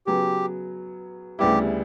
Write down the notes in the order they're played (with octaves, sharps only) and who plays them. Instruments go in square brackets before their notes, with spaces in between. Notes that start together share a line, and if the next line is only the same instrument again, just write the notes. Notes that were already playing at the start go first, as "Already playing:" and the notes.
[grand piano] C#3 F#3 B3 [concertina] G4
[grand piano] D2 C#3 G3 B3 E4 [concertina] G4